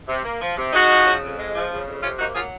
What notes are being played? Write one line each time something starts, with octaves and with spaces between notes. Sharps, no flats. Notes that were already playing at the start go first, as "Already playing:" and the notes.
C3
A#3
F3
C3
G#3 D#4 F#4
F3
C#3
F2
G#3
F3
C#3
F2
C3 C#4 F4
A#3 D#4 F#4
F#3 F4 G#4